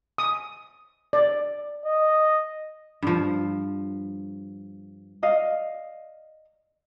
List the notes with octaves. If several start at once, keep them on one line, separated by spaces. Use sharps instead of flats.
D#6
D5
D#5
G2 F3
D5 D#5 F5